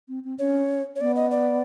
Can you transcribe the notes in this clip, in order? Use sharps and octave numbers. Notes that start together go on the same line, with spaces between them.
C4
C4
C#4 C#5
C#5
B3 D5
D#5
D5